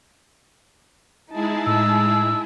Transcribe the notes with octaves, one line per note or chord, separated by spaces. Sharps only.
G#3 D#4 E4 G#4 A5
A2 E6